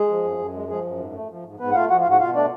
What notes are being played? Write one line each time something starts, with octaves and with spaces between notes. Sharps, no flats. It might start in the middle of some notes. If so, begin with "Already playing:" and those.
Already playing: G#3 G#4
F3
F#2
F#2
G#3
F3 G#3 G#4
F#2
G#2
A3
F3
G#2
G#2 B3 B4
F#5
A3 F4 F5
F3 F#4 F#5
F4 F5
G#2
F#4 F#5
B2 F4 F5
A3 D4 D5